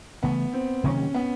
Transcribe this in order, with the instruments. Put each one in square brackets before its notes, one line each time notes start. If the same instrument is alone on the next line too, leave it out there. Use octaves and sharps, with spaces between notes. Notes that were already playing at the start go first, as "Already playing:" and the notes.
[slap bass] C#3 E3 A3 [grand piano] B3
[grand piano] C4
[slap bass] C3 D#3 F#3 A#3 [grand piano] C#4
[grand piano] B3